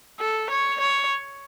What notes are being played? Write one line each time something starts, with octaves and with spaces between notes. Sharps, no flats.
A4
C#5
C#5